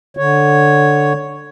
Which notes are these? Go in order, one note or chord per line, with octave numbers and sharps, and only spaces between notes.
D3 C#5